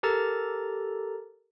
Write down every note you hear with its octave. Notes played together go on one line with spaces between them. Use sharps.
G4 A4 A#4 A#5 A6